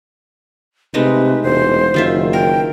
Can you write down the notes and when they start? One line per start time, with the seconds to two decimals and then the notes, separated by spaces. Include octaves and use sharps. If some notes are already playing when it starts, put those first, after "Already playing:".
0.94 C3 G#3 A3 D#4 B4
1.43 E1 C5
1.94 F#1 D#3 F4 E5
2.33 A#4 G5